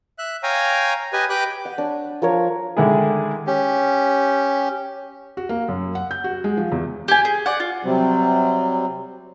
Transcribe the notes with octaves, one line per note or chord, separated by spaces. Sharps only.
E5 F#6
C#5 F5 G5 G#5 A#5
G4 B4 D#5 G#5
G4 B4 G5 D6 F#6
F#5
D4 C#5
F3 A#4 C#5
D3 D#3 G#3 E4 G#4
C#4 G4
F#4
A#3
F#2
F#5
G6
F#4
G#3
F3
E2
G4 G#5
G#4
D5 F#5
F4
C3 F#3 G3 C4